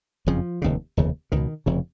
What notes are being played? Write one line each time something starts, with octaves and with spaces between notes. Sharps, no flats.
F#1 F2 C#3 F3
F1 D#2 C#3
F1 D#2 C#3
C#2 B2 D#3
F1 F2 C#3